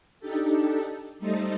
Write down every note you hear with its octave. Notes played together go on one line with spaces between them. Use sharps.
D4 D#4 G4 A4
G3 A3 D#4 A4 C5 D#5